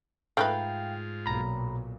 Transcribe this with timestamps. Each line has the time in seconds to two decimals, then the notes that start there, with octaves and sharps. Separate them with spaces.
0.37 G#2 A3 D#4 F4 B4 F5 G5
1.26 B1 A#2 A#5 B5